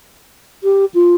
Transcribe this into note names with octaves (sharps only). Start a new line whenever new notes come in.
G4
F4